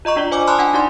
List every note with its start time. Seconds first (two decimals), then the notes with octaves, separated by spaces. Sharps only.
0.05 F4 D#5 A#5 C#6
0.16 D4 F4 D5
0.32 C5 G#5 D6
0.47 A5 B5 C6 D#6 F6 F#6
0.59 D4 F#5 G#5
0.73 D#4 F#4 D5 C6